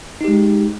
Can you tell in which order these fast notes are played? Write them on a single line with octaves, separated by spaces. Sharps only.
D#4 G4 G#3